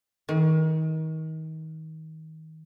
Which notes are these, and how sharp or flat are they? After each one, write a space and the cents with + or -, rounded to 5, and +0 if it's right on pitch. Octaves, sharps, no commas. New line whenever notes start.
D#3 +30